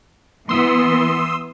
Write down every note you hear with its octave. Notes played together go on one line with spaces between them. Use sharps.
E3 B3 C6 D#6 E6